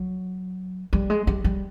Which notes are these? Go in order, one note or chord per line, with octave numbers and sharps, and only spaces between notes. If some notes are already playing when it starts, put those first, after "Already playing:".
Already playing: F#3
G3
G#3
G3
G3